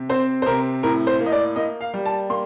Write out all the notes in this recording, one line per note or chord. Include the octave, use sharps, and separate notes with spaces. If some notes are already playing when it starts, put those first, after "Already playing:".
Already playing: C3
C4 C5
C5
C3 A#4
A2 A#4
C5
A#3
D#5
D5
A#3 D#5
F5
G3
A5
A#3 C6